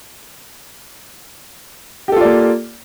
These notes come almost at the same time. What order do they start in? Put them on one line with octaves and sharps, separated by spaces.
G4 A4 F4 D5 A#3